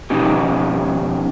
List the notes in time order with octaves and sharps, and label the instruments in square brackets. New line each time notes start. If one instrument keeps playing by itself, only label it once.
[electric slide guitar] F2 B2 C#4 D#4 G4